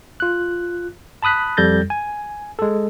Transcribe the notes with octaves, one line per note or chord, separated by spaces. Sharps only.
F4 F#6
A5 B5 D#6 F#6 B6
F2 G3 A4 G6 A6 A#6
G#5
G#3 A4